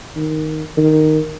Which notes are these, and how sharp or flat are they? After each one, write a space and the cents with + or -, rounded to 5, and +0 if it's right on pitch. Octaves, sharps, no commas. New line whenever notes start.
D#3 +0
D#3 -5